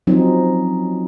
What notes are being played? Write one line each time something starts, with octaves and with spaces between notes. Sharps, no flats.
F3 F#3 C4 C#4 D#4